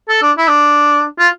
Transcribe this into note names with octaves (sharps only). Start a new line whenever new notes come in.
A4
D4
E4
D4
F4